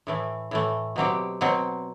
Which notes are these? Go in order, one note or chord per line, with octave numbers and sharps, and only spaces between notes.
A2 E3 A3
A2 E3 A3
B2 F#3 C4 G4
B2 F#3 C4